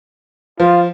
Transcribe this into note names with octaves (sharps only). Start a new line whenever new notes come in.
F3 F4